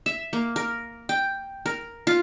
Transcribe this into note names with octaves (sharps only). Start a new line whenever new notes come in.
E5
A#3
A#4
G5
A#4
F4